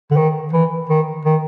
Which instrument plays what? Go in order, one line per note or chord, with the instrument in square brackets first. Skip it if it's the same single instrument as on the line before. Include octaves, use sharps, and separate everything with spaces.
[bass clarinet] D3
D#3
E3
D#3
D#3